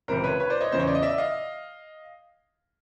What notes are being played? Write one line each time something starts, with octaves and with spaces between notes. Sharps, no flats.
C#2 C3 E3 A#4 C5
B4 C#5
B4 C#5
C5 D5
C#5 D#5
E2 C#3 E3 C5
C#5
D5
D#5
D5 E5
D#5 F5